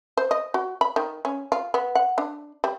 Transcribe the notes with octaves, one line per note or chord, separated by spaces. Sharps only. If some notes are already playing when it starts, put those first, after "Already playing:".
C5
D#5
F#4
B5
D#3
C#4
F4
B3
F#5
D4
G3